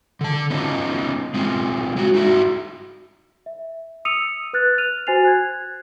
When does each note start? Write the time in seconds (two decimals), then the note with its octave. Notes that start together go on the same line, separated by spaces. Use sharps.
0.21 D3 A5
0.50 B3 C#4 D#4 F4
1.34 G#3 C4 F4
1.96 G#3 F#4
2.14 D#4 E4 F#4
3.46 E5
4.05 D#6 E6 C#7 D#7 F7
4.53 B4 F6 F#6 A6
4.78 F6 D#7 F7
5.07 F#4 C5 G#5 A6 C7 F7
5.24 F#6 G#6